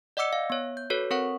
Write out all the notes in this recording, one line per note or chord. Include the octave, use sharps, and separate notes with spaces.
D5 D#5 F#5 D6 E6 C#7
F5
B3 C#5
G6
F#4 A4 B4 C#5
C4 A#4 C#5 F#5 C#6